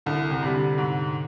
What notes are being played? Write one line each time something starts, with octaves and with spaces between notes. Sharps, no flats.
C2 D3
C3
C3 G3
D3
G#2